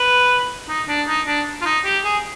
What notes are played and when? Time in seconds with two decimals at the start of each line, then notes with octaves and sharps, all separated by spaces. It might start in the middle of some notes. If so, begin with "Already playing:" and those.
Already playing: B4
0.69 D#4
0.88 D4
1.08 D#4
1.27 D4
1.62 F4
1.65 D#4
1.85 G4
2.05 G#4